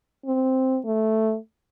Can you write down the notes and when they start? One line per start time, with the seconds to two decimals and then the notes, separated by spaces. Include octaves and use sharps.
0.26 C4
0.85 A3